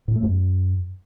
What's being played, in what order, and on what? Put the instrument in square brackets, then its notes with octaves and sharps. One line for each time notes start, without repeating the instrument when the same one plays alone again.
[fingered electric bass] A2
A3
F#2